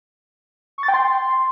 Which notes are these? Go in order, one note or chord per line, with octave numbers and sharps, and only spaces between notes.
C#6
A6
G5
C6